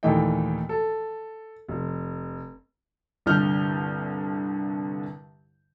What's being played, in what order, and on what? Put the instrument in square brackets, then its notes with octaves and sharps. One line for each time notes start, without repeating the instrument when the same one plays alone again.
[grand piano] D#2 A#2 E3 A3 D#4 G5
A4
F1
[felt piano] C2 G2 D3 F6 G6